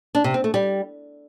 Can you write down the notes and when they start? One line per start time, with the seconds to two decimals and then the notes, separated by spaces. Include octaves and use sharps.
0.15 D4
0.24 C3
0.34 C4
0.44 A3
0.54 G3